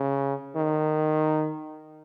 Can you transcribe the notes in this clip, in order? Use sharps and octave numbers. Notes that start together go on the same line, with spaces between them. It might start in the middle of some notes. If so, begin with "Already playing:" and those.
Already playing: C#3
D#3